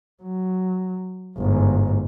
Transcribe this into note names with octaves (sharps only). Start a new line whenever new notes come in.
F#3
G1 G#2